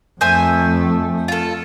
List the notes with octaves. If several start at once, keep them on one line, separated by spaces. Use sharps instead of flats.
F2 A3 C5 E5 G#5
F4 A4